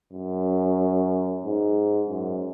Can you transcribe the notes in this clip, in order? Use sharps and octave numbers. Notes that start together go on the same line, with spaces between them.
F#2
G#2
F#2